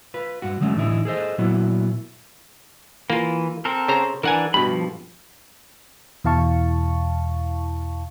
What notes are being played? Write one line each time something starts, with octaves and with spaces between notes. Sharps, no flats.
F4 B4
G2 F#4
D3 F#3 G#3 A3 C#4
A2 D3 E3 D#4 E4
G#4 A4 C5 D#5
A#2 F#3 B3 E4 F#4
E3 A#3 F4
C4 A4 A#4
C#3 C5 A#5
E3 D4 A#4 F#5 G#5
G2 B2 B5
F3
E2 B2 E4 F5 A5 C#6